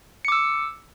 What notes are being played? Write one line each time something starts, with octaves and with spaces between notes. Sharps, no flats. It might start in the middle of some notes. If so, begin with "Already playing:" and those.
D6 E6 C#7